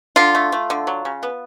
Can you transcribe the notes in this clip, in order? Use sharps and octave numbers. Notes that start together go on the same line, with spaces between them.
D3 F4
A3
A3
D3
F#3
C#3
B3